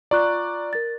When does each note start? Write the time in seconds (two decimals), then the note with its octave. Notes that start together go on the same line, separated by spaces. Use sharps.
0.11 F4 D5 A#5 C#6 F#6
0.73 A#4 A6